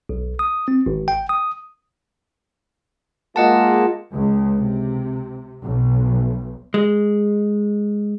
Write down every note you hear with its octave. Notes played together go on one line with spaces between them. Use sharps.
B1
D#6
C4
G#1
G5
D#6
G#3 A#3 F4 D#5 F#5 A5
C#2
C3
B1
G#3